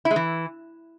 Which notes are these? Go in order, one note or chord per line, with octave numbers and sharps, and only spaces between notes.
E4
G#3
E3